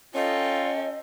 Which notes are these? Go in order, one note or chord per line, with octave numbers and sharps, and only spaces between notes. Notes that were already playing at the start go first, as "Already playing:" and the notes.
C#4 F4 A4 D#5 G5